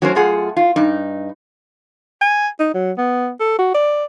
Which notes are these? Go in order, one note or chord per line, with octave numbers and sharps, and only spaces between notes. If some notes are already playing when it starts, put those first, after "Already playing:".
F#3 A3 C#4 A#4 C5
F#2 A3 F4 G#4 F#5
F4
G2 D#4
G#5
D#4
F#3
B3
A4
F#4
D5